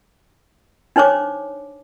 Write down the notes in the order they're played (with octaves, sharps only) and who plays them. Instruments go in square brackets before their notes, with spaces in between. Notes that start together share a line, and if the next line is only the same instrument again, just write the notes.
[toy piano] D4 D#4 C5 C#5 D6